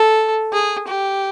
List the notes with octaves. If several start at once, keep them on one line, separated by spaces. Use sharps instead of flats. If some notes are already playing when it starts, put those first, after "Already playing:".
Already playing: A4
G#4
G4